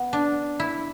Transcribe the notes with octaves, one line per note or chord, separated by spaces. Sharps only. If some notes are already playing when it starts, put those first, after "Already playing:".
Already playing: B3
D4
E4